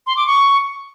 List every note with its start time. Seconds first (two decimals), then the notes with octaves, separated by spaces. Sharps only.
0.07 C6
0.17 D6
0.27 C#6